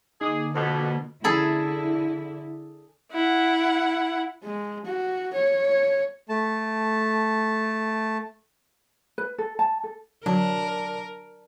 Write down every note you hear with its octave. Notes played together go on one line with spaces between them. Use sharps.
D3 A#3 D#4 G#4 D6 D#6
F2 B2 A4 F#5 D6
D3 E4 G#4 A4 B5
E4 F#5
G#3
F#4
C#5
A3 A5
B4
A4
A5
A4
D3 F#3 D4 A#4